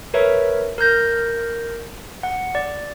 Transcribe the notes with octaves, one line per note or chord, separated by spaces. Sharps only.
A#4 B4 C#5 E5
A#4 F6 G6 A#6
F#5
D5